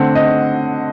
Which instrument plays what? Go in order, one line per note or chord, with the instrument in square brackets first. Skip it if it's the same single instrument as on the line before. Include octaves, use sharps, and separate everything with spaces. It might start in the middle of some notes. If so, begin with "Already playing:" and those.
Already playing: [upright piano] D3 A3 C4 F#5
D#5